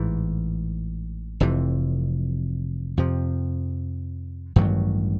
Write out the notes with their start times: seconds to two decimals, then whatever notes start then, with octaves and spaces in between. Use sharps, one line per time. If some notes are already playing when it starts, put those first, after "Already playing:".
Already playing: A1 G#2 E3
1.40 F1 F2 C3 E3
2.97 F2 C3 F3
4.56 A1 G2 D#3 F#3